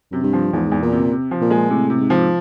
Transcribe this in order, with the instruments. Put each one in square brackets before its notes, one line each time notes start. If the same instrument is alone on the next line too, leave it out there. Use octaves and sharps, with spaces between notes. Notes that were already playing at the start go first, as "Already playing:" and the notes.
[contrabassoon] F#2 [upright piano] C3
[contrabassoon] G2
[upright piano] F3
[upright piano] E2 [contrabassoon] G#2
[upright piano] E2
[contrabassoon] A#2
[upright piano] C3
C3
F3
[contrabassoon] A#2
[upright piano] G#3
[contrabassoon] A2 [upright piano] C3
[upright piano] C3
[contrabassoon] G#2
[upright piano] F3